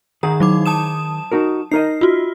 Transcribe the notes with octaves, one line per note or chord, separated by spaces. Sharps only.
D#3 G#4 F#5 A#5
F#3 D#4 D6
A5 D#6 E7
D#4 F#4 A#4
D#4 A#4 D#5 C7
F4 F#4